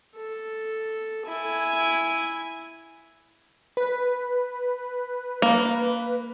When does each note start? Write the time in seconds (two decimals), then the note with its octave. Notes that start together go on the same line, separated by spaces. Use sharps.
0.17 A4
1.26 E4 G#5
3.77 B4
5.42 A#3